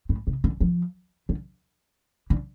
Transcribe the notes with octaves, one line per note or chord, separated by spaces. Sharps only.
A2
C3
D3
F3
D3
D3